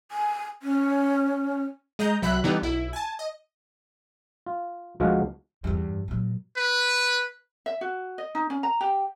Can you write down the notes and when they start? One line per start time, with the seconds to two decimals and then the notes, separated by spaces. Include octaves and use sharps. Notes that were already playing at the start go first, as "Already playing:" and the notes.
0.12 G#5
0.62 C#4
1.99 G#3 D#5 A#5 G6
2.22 C2 F#3 E5 B5 F#6
2.44 D3 E3 G3 B3 D#4 G4
2.62 B1 E4
2.93 G#5 A5
3.19 D#5
4.47 F4
5.00 D2 F3 G#3 F#4 F5 F#5
5.64 E2 G2
6.08 A#2 F#3
6.56 B4
7.66 E5
7.81 F#4
8.18 D#5
8.35 D#4
8.50 C#4
8.63 A#5
8.81 G4